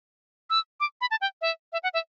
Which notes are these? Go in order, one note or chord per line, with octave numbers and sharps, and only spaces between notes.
E6
D6
B5
A5
G5
E5
E5
F#5
E5